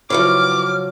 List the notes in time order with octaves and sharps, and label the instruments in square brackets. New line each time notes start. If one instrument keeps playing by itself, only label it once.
[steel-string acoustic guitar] C#3 F3 F#3 [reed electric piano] E4 B4 C#5 [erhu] D6 [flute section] F6